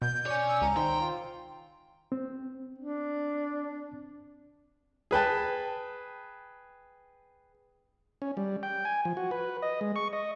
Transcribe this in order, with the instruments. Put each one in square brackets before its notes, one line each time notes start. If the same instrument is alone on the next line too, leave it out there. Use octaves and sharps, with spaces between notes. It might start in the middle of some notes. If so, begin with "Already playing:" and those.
[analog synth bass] B2 [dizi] G6
[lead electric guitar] C#5 G#5 [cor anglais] D5
[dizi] E6
[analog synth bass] C#2 [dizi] A#5
[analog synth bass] D#3 [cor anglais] C5 [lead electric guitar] G5
[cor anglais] F4
[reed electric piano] C4
[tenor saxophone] D4
[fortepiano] G#4 B4 G5 A5
[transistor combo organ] C#4
G3
G5
G#5
F3
F#4
B4
D#5
G#3
C#6
D#5